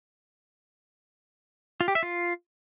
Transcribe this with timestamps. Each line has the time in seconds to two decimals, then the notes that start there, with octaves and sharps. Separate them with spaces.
1.81 F4
1.88 G4
1.95 E5
2.03 F4